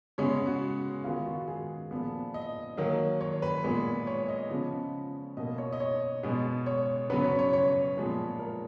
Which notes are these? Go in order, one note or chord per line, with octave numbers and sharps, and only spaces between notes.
C#3 G#3 B3 C#5
F#4
D#3 G#3 B3 F4
F#4
G#4
A#2 F3 B3
D#5
D#3 F#3 A#3
C#5
B4
A#2 G#3 B3
C#5
D#5
C#3 F3 B3
B2 A#3 D#5
C#5
D#5
C#5
B2 G#3 B3
C#5
C#3 F#3 B3 B4
C#5
C#5
C#5
A#2 F3 G#3 B3
A#4